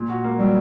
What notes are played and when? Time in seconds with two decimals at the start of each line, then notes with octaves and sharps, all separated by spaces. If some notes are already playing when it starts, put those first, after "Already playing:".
Already playing: A#2
0.09 F#4
0.24 A#3
0.38 F#3 G3